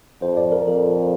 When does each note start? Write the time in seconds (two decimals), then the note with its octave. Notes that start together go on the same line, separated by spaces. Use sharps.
0.21 F2 C5
0.37 D5
0.52 A#4
0.67 F2 A4